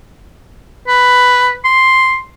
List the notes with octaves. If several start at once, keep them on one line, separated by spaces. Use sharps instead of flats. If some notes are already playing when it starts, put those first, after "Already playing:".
B4
C6